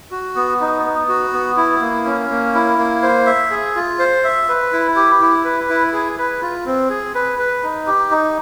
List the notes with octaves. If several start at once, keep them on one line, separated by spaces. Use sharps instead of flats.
F#4
B3
D#4
B3
F#4
B3
E4
A#3
C#4
A#3
E4
A#3
C5
E5
G#4
F4
C5
E5
B4
E4
G4
E4
B4
E4
G#4
B4
F4
C4
G#4
B4
B4
D#4
G4
D#4